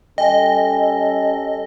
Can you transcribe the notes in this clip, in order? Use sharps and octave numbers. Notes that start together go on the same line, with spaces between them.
G3 C#4 A4 D#5 G5 G#5